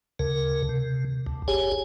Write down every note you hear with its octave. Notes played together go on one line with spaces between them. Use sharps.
D2 C#3 A#4
C3
D2
F#1 G4 G#4 C#5 G#5